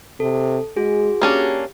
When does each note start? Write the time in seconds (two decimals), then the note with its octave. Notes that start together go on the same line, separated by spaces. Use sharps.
0.20 C3 A4
0.76 G#3 F#4 G#4
1.22 A#3 C#4 D4 G4